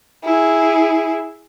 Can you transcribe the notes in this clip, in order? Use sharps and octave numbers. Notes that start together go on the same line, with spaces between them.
E4 G#4